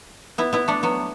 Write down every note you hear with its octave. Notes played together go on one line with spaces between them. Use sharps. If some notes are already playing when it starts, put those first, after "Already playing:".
B3 E4
B3 E4
A3 D4
F#3 B3